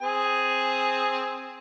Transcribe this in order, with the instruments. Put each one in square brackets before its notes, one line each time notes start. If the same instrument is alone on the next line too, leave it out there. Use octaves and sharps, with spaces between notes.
[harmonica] C4 G#4 G#5